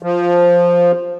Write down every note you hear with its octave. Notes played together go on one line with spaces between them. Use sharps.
F3